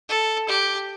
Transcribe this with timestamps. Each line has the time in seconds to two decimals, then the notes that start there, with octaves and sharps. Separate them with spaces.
0.09 A4
0.48 G4